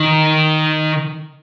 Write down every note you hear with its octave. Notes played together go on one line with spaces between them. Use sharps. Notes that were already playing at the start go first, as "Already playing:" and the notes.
Already playing: D#3